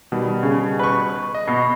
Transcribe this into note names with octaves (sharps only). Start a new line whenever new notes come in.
B2 D#3 G3
C#3
B4 C#6
D#5
B2